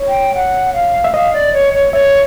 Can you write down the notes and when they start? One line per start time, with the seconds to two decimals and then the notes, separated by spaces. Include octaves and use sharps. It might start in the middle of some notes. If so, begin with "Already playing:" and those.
Already playing: C#5
0.08 G5
0.35 F#5
0.74 F5
1.04 E5
1.14 D#5 F5
1.33 D5
1.53 C#5
1.74 C#5
1.93 C#5 E5